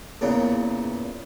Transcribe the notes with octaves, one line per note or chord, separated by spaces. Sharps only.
E2 A#2 C#3